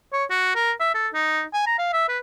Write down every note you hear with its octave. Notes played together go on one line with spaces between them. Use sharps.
C#5
F#4
A#4
E5
A4
D#4
G#5
A#5
F5
E5
B4